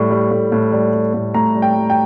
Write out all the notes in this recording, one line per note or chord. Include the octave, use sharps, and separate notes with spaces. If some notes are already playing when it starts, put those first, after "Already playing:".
Already playing: A2 G3
G3
A2
A2
G3
G3
A2
A2 A#5
G3
G5
G3
G5